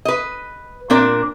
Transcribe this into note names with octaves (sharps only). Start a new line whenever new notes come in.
B4 D#5
A#2 C4 D4 A#4 D5